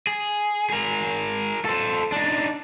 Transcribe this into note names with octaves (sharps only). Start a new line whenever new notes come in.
G#4
G#4 A#4
A4 C5
D4 D#4